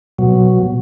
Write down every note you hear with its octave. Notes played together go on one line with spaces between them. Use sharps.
B2 F#3